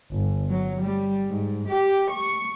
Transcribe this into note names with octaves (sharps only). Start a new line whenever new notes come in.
G1
F#3
G3
G#2
G4
C#6